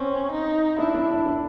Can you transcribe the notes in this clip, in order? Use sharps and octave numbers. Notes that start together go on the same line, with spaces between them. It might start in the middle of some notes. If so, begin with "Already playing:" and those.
Already playing: C4 C#4
D#4
D4 E4
D4
D4
D4